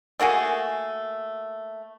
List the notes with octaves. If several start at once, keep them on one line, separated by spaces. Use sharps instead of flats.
A3 A#3 F#4 G#4